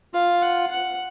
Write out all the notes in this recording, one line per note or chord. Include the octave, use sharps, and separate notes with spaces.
F4 F5
F#5
F#5